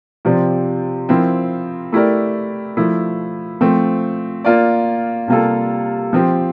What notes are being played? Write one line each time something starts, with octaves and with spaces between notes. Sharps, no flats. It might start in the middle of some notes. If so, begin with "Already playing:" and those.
C3 F3 C4 G4 D5
F3 C4 E4 A#4
A3 E4 G4 A#4 D5
F3 A3 E4
F3 A3 C4
A#3 F4 A#4 D5
C3 G3 A#3 F4 A4
F3 C4 G4